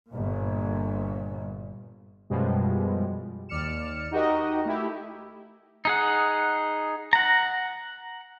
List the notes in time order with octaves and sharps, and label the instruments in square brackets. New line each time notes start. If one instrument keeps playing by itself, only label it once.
[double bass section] G1 A#2
[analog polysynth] F#2 B2 F3 G3 G#3
D#2 D5 F6 C#7 E7
D#4 F#4 G4 A#4 D#5
A3 E4 G4
[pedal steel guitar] D#4 G#4 F#5
F#5 A#5